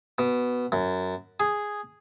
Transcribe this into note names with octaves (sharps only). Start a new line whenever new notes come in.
B2
F#2
G#4